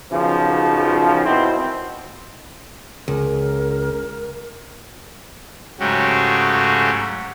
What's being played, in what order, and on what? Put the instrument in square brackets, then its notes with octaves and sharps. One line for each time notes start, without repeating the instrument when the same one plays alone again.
[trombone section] B1 C#3 F3
G#1 B2 C4 E4 C5
[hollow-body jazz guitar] C#2 [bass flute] A#4
[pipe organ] G#2 C#3 F#3 A3 F#4 G4